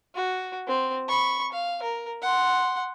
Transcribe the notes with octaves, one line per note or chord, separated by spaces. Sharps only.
F#4
C4
B5 C#6
F5
A#4
F#5 C6